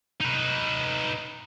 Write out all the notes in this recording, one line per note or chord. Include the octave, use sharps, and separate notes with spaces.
D#4 B4